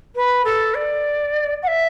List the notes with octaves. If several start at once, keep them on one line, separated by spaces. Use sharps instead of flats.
B4
A4
D5
F#5
E5